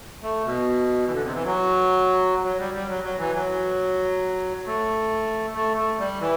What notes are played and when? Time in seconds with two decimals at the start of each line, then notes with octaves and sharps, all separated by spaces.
0.23 A3
0.45 B2
1.07 E3
1.12 D3
1.23 C3
1.33 E3
1.45 F#3
2.44 F#3
2.59 G3
2.74 G3
2.89 F#3
3.04 F#3
3.19 E3
3.33 F#3
4.67 A3
5.55 A3
5.77 A3
5.99 G3
6.21 E3